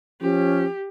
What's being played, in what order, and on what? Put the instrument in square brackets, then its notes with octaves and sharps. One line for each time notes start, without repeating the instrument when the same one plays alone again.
[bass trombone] F3 [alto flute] C#4 [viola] G4